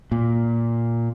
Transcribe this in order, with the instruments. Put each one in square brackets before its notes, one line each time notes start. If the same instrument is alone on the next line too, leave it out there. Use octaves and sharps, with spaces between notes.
[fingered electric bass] A#2